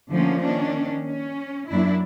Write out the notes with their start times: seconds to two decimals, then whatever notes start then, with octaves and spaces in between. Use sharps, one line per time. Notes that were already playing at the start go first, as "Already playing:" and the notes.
0.12 D3 F3 A3 A#3 C#4
0.42 D#3 A#3 C#4 D4
1.05 C#4
1.70 F#2 A#3 D4 E4